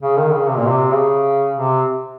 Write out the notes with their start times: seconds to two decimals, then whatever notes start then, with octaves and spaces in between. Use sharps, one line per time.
0.01 C#3
0.17 D#3
0.32 C#3
0.46 C3
0.57 A#2
0.67 C3
0.92 C#3
1.54 C3